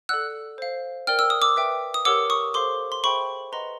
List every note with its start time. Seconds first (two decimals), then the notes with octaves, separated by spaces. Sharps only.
0.09 A4 D5 F#5 E6 F#6
0.58 C5 F5
1.07 A#4 D5 G5 F6
1.19 E6
1.30 D#6
1.42 D6 E6
1.56 B4 E5 G5
1.94 D#6
2.05 G4 A#4 C#5 F#5 D6 E6
2.30 C#6 D#6
2.54 A4 C5 F5 C6 D6
2.92 C6
3.04 G#4 C5 E5 G5 B5 C#6
3.52 B4 D#5 F#5 A#5 C6